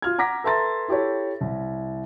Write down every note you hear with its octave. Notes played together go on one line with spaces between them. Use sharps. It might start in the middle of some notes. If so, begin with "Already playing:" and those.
F4 F6 G#6
F#5 A#5 D6 A#6 B6
A4 B4 E5 A#5 C6 A6
E4 G4 A4 C#5
C2